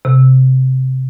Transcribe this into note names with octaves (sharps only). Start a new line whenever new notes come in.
C3